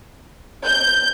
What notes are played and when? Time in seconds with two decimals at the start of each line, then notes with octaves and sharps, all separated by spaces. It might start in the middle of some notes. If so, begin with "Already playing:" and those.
0.65 G6